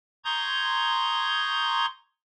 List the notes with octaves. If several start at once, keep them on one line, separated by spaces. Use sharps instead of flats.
A#5 C6 C#6 D#6 G6 G#6